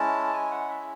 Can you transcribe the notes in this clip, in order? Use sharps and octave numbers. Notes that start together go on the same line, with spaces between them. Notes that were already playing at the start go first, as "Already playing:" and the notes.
Already playing: G#3 C#4 E4 A5
G#5
F#5
E5